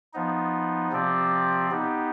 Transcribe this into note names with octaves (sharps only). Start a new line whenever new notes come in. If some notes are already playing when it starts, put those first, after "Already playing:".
F3 B3 D#4
C3 F3 C4 G4 D5
B3 D#4 G4